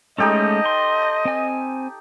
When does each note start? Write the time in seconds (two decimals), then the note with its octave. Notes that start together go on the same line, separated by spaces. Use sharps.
0.18 G#3 A3 C#4 D#4 G4 A4 D#5
0.66 C6
1.25 C4 G#5